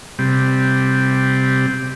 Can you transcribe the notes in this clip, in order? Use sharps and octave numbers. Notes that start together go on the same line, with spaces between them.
C3 G3